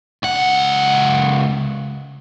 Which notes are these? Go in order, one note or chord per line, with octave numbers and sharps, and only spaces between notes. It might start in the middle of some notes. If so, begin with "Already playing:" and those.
C#2 F#5